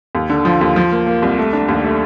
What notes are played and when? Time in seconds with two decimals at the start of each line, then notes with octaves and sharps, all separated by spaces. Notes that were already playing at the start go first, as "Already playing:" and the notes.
0.15 D#2
0.30 D3
0.45 F3
0.61 D#2
0.76 F3
0.92 A#3
1.07 A#3
1.22 C2
1.38 A3
1.53 D4
1.69 D#2
1.84 A3